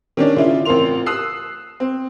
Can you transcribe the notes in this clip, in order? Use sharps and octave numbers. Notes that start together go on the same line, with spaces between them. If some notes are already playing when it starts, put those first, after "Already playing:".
D#3 C#4 D4 D5
C#3 E4 F4
A1 C4 F4 A#4 C6 F7
D#6 E6 F#6 C7
C4